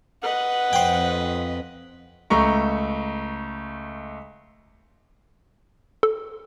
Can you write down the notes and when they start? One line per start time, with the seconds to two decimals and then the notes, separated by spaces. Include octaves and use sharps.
0.23 B4 D#5 F#5
0.73 F2 C5 G5
2.30 C#2 A3 A#5 C#6
6.03 A4